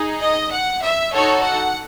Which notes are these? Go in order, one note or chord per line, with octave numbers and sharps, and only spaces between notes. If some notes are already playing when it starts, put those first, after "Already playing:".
Already playing: D#4 G#4
D#5
F#5
E5
D#4 F#4 A4 C#5
F#5